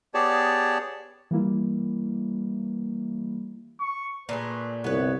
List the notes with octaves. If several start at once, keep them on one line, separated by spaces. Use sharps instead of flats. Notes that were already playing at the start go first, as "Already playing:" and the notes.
B3 G4 G#4 C#5 D5 A5
E3 G3 A#3 E4
C#6
A#2 A3 G#4 B4
G1 C2 B3 B4 C#5